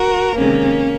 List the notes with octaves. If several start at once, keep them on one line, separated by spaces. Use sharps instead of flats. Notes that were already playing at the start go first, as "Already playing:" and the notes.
Already playing: F#4 A#4
C3 D#3 G#3 A#3 C#4